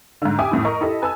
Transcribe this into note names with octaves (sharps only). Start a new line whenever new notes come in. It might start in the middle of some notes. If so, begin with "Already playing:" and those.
G#2 D3
G4 E5 G5 G#5 D6 D#6
E2 A2 E4
A#4 D#5 C#6
E4 G4 A4 D#5
B4 G#5 A5 E6